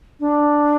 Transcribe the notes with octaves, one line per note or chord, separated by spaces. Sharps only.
D4